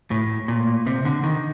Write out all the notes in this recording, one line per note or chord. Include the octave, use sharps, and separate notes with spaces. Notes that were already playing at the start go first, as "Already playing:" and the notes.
A2
A#2
C3
D3
D#3